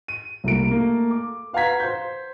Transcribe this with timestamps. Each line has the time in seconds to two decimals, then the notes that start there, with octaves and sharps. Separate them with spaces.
0.08 D#7
0.44 C2 A3 A#3 D7
0.71 A3 A#3
1.11 D6
1.53 B4 F5 F#5 A#5 G#6 B6
1.80 C5 G6